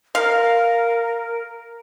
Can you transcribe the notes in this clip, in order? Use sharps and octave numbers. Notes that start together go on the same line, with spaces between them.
A#4 F5